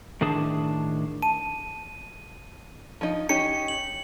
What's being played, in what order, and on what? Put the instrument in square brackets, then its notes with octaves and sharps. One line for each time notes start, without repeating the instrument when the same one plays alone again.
[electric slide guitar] A2 D#3 D4 G#4 A5
[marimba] A5 [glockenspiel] D#7
[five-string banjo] F3 D#4
[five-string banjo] C#4 D#4 G4 [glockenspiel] C#7
[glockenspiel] F#7